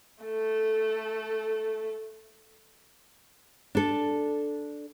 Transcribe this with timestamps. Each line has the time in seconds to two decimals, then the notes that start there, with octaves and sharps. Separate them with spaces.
0.24 A3 A4
3.75 D4 A4